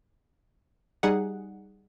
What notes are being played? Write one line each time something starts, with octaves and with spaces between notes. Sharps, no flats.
G3 D#4 G#4 F#5